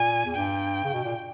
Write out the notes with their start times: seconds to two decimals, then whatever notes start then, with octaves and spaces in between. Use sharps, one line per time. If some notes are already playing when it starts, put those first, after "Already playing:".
Already playing: A#2 G#5
0.25 E2
0.36 G2 G5
0.84 C#3
0.93 B2
1.04 A#2